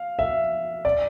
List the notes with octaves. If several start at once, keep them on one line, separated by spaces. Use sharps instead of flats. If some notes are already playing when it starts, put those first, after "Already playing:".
Already playing: F5
E5
D5